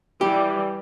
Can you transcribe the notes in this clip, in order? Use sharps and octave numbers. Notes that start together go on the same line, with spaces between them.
E3 G3 G4